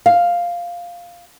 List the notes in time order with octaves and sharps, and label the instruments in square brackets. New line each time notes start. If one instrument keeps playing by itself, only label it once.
[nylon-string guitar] F5